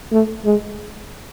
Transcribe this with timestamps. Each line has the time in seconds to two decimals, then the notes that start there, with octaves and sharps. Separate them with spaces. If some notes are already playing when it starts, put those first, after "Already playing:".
0.12 A3
0.45 G#3